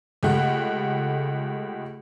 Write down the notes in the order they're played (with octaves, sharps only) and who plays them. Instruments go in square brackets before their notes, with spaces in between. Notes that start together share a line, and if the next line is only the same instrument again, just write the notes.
[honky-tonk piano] C#2 A3 G4 F#5